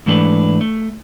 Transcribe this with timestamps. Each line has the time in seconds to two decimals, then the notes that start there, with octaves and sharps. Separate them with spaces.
0.06 G#2 E3 A3 D4 G#4 B4
0.61 A3